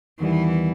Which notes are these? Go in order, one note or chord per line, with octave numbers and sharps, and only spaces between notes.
E2 D#3 E3 G3 B3